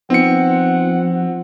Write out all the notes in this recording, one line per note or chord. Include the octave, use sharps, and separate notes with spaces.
F3 B3 C4 D#4 F#5 C#7